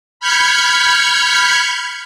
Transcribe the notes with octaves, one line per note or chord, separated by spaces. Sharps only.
B5 F6 G6 G#6 B6 C#7